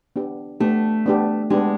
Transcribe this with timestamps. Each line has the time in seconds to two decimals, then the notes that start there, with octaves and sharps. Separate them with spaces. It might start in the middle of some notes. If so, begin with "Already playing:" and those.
0.16 B3 D4 G4
0.60 A3 B3 D4 G4
1.06 B3 D4 G4
1.50 G#3 B3 D4 G4